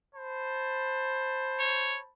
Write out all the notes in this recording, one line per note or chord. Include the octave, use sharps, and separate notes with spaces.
C5 A5 B5
C#5